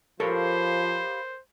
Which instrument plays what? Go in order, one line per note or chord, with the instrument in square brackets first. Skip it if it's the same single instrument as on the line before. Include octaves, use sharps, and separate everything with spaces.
[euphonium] F3 [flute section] G4 F5 B5 [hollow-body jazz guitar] A4 A#4 C#5 [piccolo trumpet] C5